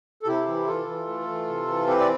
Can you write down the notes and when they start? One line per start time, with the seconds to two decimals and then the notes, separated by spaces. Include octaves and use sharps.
0.23 A4
0.27 C3 E4 G4
0.47 E3
0.67 E3 F4 A4
0.87 E3
1.07 A3
1.28 E3
1.47 C3
1.67 E3
1.87 C4 G4 B4
2.00 D5